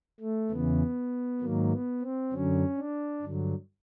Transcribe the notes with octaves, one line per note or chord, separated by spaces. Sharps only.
A3
E2 C#3 E3 B3
G#2 D#3 F#3 A#3
B3
C4
F#2 D3 F#3 C#4
D4
G2 D3 F#3